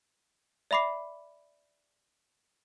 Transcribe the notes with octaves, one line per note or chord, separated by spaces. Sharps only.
D5 E5 B5 D6 C7